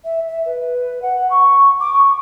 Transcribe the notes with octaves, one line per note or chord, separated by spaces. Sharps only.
E5
E5
B4
F#5
C#6
D6
C#6